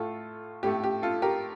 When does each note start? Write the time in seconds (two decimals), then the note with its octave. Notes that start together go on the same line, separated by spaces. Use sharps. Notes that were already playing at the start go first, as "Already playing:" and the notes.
Already playing: A2 A3 F4 A4
0.63 A2 A3 G4
0.84 G4
1.02 F4 A4
1.22 G4 A#4